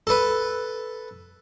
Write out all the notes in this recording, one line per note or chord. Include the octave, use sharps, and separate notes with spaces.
A4 B4